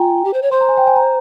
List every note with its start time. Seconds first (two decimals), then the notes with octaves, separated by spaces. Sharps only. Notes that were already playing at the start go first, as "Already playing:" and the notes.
Already playing: F4 G5 G#5 A#5
0.25 G4
0.33 C5
0.42 C#5
0.51 C5 C6
0.61 A#5
0.69 G#5
0.77 G5
0.87 G#5
0.96 A#5